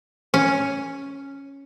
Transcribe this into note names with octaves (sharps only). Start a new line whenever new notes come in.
C#4